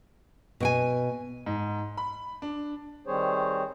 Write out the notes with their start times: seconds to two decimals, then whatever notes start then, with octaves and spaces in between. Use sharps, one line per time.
0.60 B2 G5 G#5
1.46 G#2
1.97 B5
2.42 D4
3.07 D#3 G3 C4 G#4 C5 C#5